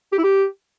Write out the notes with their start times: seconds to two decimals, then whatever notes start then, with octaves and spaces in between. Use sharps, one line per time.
0.12 G4
0.18 E4
0.24 G4